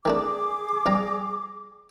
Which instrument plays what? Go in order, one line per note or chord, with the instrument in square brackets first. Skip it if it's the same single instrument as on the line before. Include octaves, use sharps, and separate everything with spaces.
[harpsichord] D#3 A3 D4 [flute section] G#4 D6
[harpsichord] A#1 G3 A#5